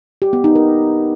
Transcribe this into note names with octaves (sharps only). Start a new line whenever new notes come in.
G4
B3
D#4
A#4